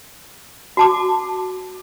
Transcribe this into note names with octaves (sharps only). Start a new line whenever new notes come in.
F#4 A5 D6